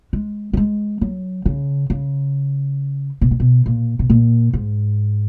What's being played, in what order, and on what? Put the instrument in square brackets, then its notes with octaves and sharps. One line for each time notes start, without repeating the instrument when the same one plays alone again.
[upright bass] G#3
F#3
G#3
F#3
C#3
C#3
B2
A#2
B2
A#2
B2
A#2
G#2